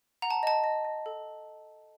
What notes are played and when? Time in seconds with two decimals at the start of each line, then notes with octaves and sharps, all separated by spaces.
0.22 F#5 A#5
0.30 A5
0.43 D#5 A5
0.64 D#5
0.85 D#5
1.06 A4